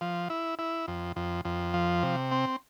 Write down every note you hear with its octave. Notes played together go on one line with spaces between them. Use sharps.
F3
E4
E4
F2
F2
F2
F3
C3
C4